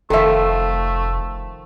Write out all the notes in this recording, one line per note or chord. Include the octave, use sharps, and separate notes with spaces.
F1 D#3 F3 A3 A4 E5